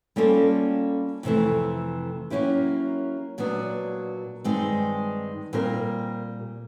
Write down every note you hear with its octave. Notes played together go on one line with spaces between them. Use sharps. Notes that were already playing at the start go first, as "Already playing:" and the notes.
G3 A#3 C#4 F4 A4
F2 C3 E3 A3
F#3 A#3 C#4 E4 G4
A#2 F#3 B3 D4
G2 D#3 G#3 C4
A#2 G3 C4 F4 A#4